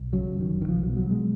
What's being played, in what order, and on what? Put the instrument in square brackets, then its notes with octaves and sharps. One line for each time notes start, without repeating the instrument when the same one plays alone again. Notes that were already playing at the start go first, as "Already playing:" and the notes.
Already playing: [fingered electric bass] B1
C#3 F#3
F#1
D#3
F#1
D#3
B1 F3
B2 F#3
F#3
B2 G#3